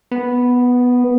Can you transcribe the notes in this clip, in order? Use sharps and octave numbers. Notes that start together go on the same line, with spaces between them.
B3